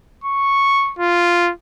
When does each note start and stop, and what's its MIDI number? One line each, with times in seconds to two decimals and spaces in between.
0.24 0.93 85
0.99 1.52 65